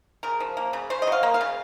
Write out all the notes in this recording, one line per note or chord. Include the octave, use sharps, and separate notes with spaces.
C#3 A#4
F3
A#3
C#3
C#3 C5
D#5
F#3 F5
A#3
F5
C#3